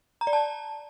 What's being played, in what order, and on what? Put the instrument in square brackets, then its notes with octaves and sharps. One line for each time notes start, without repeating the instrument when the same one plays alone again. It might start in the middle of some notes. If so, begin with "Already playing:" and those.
[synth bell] A#5
D5
A5